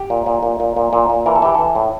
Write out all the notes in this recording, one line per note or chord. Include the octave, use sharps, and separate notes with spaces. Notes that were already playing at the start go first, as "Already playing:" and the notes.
Already playing: G4
A#2
A#2
A#2
A#2
A#2
A#2
A#2
E3 A#4
A4
E3 G4
E3 A4
A2